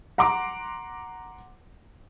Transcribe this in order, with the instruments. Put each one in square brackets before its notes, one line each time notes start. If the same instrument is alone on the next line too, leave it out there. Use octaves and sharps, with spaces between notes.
[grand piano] F#5 A#5 C6 D6